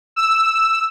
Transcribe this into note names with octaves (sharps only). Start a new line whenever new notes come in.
E6